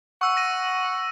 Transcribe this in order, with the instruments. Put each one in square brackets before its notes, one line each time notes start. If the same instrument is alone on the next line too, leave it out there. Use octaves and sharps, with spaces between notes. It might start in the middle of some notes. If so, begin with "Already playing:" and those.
[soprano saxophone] F#5 [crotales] C#6 E6
[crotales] A#6 D#7